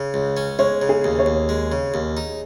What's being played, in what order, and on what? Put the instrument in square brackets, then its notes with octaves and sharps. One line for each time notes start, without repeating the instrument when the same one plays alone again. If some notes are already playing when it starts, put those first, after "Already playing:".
Already playing: [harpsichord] C#3
C#2
C#4
[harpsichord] G#3 [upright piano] C#5
[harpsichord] C#3
[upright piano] G#4
[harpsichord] D#2
[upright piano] C#5
[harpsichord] D#2
G#3
C#3
D#2
D#4